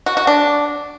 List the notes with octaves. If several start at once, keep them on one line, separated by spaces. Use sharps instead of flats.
F#4
F#4
D4